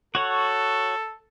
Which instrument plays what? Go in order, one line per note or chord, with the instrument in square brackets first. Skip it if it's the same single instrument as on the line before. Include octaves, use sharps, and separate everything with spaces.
[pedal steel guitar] F#4 C#5 F#5 [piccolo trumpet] A4